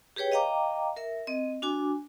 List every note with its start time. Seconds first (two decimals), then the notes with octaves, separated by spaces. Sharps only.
0.16 G4 G#4 B4 C#5 G5
0.32 D#5 F5 G5 A#5 D6
0.96 A#4 E5
1.27 C4 D#5
1.62 D4 F#4 G#5 D6